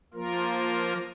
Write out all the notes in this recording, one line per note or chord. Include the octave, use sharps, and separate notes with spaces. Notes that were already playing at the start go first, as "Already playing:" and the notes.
F3 A#3 F4 A#4